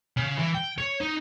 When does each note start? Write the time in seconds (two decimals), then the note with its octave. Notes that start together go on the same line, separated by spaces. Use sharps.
0.17 C#3
0.37 E3
0.55 G5
0.78 C#5
1.01 D#4